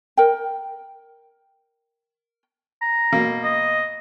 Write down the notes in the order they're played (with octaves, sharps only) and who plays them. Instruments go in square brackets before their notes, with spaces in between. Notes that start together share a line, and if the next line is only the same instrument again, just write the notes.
[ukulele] A#4 G5
[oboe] A#5
[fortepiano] B2 A#3
[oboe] D#5